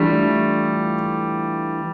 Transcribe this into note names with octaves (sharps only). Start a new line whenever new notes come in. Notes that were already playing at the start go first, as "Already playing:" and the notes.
Already playing: E3 G3 A3 D4 F4 A4